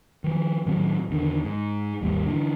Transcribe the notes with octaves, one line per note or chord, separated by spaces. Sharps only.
D#3 F3
A2 D#3 F#3 C4
E2 D3 D#3
G#2
G#1 D#2 G3 A#3
D3 E3